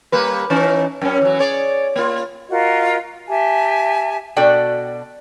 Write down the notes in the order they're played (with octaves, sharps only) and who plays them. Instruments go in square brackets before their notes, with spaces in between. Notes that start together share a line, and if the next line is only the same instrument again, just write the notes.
[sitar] G3 A#3 B4
E3 C#4 D#4
F#2 C#4
E3 F#3
G#4 C#5 D5
A#3 F4
[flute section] F4 F#4 A#4 D#5
G4 E5 G#5 A5
[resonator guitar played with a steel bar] B2 D4 F#4 A4 D5 G5